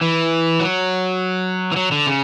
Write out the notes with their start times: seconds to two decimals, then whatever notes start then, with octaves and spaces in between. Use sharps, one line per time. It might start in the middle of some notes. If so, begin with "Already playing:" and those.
0.01 E3
0.60 F#3
1.72 E3
1.76 F#3
1.92 D3
2.07 C#3